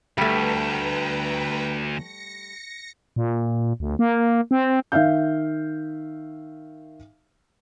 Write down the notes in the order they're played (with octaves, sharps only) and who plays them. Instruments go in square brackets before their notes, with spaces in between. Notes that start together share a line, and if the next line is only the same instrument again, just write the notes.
[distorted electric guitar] D2 [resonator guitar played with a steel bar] G3 A3 [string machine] B4 G5 A#5
[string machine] A#6 C#7
[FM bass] A#2
D2
A#3
C4
[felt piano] D#3 E5 F5 G6